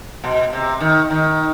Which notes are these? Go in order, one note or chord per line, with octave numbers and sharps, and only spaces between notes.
B2
C3
D#3
D#3